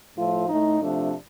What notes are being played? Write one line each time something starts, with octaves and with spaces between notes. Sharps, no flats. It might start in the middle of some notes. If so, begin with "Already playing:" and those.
A2 F3 A3 F4
A2 A3 D#4
C3 F3 A3 D4